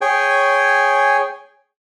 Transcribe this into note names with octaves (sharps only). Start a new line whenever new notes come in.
G#4 C#5 G5 G#5